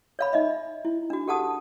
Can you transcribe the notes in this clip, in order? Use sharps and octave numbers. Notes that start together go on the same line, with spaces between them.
C#5 F5 B5
D#4 D#5 E5
E4
D4 F#4
G4 A4 F#5 A5 D#6